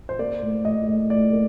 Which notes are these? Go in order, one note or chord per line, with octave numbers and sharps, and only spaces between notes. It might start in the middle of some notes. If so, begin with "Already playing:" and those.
C5
A#3 D5
A2
A2 D#5
A2
A2 D5
A#3